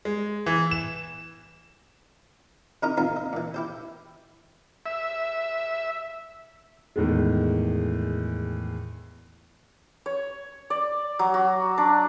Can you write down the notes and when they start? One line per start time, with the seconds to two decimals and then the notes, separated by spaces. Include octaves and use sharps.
0.05 G#3
0.46 E3
0.71 E7
2.83 C3 D#4 E4 A#4 D#5 A#5
2.97 B3 C4 D#4 F4 A#4
3.16 D#5
3.33 A#2 E3
3.54 E4 G4 C5
4.86 E5
6.96 E2 A2 D#3 G#3
10.06 C#5
10.70 D5
11.19 F#3
11.34 F#4
11.78 D4